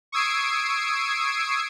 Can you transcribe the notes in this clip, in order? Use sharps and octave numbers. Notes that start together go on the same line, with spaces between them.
C#6 D#6 E6 G#6 C7 D7